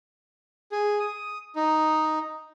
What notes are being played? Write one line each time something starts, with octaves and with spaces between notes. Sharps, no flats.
G#4
D#6
D#4